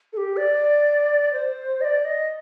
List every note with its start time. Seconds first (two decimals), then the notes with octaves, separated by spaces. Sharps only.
0.13 A4
0.17 G4
0.37 D5
1.33 C5
1.81 D#5
1.84 D5
2.05 D#5